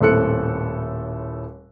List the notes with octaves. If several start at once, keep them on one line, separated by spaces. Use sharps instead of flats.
D#1 A2 C4 A4 F#6 C#7